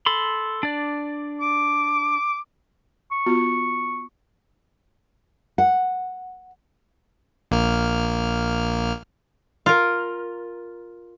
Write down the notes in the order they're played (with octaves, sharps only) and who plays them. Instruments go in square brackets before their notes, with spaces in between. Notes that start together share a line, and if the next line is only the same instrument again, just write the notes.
[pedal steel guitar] A4 B5 C6
D4 D5
[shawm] D6
[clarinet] C#6
[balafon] B3 F4 F#4
[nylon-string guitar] F#5
[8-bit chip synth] A#1 A#3 F6
[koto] F4 A#4